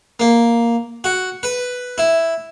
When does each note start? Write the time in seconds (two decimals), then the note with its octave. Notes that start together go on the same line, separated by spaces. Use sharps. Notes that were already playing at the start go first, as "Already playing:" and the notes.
0.20 A#3
1.04 F#4
1.43 B4
1.98 E4